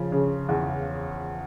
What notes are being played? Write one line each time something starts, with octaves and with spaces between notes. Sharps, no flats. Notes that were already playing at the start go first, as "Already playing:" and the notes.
Already playing: C#3 F3
C#3
E2